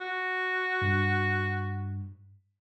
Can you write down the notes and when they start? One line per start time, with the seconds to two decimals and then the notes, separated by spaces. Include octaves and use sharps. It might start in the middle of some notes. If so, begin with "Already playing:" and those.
0.01 F#4
0.82 G2